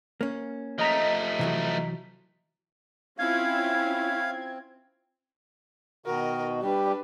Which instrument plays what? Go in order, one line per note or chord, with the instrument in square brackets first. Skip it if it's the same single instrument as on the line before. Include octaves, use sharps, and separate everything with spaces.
[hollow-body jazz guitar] A#3 C#4
[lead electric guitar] F3 A3 [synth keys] D#5 A#5 B6
[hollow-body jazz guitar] C3 E3 F#3
[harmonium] C4 [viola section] C#4 E4 F4 [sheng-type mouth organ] F5 [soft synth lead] G#6
[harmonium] B2 D#3 F#4 [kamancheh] A#4 D#5
[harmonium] G3 G4 [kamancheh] D4 B4